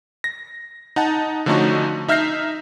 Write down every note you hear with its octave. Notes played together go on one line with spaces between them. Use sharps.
A#6
D#4 F#5 A5
D3 F3 A3 C#4 D#4 F#4
D#4 E5 F6 G6 A#6 C7